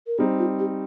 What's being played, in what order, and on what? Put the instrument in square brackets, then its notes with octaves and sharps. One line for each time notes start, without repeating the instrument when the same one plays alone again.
[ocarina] A#4
[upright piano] G3 C4 D#4 [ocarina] G#4
[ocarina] F4
G4